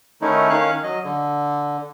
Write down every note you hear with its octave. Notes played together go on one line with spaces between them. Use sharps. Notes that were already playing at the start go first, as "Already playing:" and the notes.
D#3 A3 C#4 D#4 E4
D#3 C#4 C#5 F5 F#6
F#3 D#5
D3